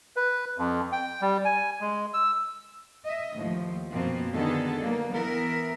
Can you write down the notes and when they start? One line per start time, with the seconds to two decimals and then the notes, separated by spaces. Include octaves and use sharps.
0.16 B4
0.58 F2
0.92 G5
1.21 G3
1.45 G#5
1.81 G#3
2.14 E6
3.05 D#5 E5
3.36 D#2 A2 F3
3.93 F#2 B2 F3 A#3 C4
4.34 D3 D#3 B3 D#4 G#4 A4
4.80 F#3 A#3
5.13 E3 B3 A#4 E5